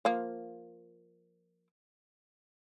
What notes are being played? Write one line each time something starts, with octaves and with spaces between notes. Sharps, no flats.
F3 A#3